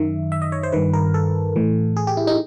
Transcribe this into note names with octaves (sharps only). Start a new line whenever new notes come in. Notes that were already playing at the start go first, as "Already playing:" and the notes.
Already playing: F#2 D#3 E5
E5
D#5
C#5
C5
G2 D#3 B4
A#4
A4
A2 E3
G#4
G4
E4
D#4